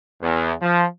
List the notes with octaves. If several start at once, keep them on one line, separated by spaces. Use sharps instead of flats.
E2
F3